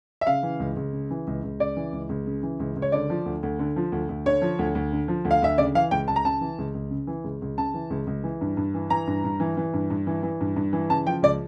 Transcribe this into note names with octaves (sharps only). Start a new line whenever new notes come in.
E5
C#3 F5
E3
C#2
C#2
C#3
E3
C#2
C#2
C#3 D5
E3
C#2
C#2
C#3
E3
C#2
C#2
C#5
D3 D5
F3
D2
D2
D3
F3
D2
D2
D3 C#5
F3
D2
D2
D3
F3
D2
F5
D2 E5
C#3 D5
E3 F5
C#2 G5
C#2 A5
A#5
C#3 A5
E3
C#2
C#2
C#3
E3
C#2
C#2
C#3 A5
E3
C#2
C#2
E3
G2
G2
E3
E3 A#5
G2
G2
E3
E3
G2
G2
E3
E3
G2
G2
E3
C#3 A5
F3 G5
C#2 D5